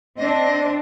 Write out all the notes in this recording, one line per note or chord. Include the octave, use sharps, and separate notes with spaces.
C4 D4 D#5